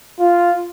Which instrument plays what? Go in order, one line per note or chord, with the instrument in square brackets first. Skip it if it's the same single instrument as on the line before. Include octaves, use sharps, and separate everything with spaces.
[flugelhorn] F4